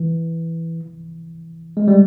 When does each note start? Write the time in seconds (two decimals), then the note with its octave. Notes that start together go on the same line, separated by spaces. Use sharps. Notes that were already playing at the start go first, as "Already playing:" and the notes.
Already playing: E3
1.77 G#3
1.88 G3